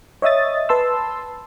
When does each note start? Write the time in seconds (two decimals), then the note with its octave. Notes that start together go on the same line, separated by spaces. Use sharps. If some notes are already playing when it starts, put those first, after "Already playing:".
0.22 C#5 D#5 E5 D#6 A6
0.69 B4 A5 C6 E6